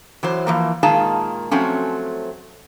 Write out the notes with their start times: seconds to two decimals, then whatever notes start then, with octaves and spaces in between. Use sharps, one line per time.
0.23 E3 F#3 C5
0.47 E3 F3 A#3
0.83 A#2 D#3 G#3 G#4 F5 A5
1.51 F3 F#3 A3 C4 C#4